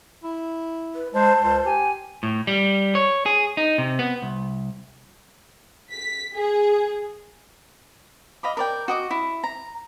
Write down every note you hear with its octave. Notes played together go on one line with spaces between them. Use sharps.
E4
B4
G#3 C5 A5
C#2 C5
G4 G#5
A2
G3
C#5
G#4
D#4
C3
B3
C2
B6
G#4
D#5 F5 B5 D6
A#4 D5 G5
F#4 D#5 D6
E4
A#5